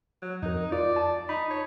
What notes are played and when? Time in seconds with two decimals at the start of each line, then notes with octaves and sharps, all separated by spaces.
0.22 F#3
0.43 F2 D#4 A#4
0.72 F4 D5
0.96 A5
1.29 D#4 B5
1.50 C#5